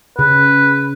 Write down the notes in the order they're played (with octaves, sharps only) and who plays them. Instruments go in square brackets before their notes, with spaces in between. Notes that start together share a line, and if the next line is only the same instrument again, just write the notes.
[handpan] C#3 [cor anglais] B4